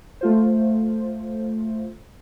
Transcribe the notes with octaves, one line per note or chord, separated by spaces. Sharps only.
A3 F4 C5